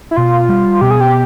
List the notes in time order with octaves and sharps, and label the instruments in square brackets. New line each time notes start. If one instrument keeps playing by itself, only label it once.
[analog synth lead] E4
[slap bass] B2 [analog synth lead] F4
[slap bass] G3
[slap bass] B2 [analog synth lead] G4
[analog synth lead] G#4
G4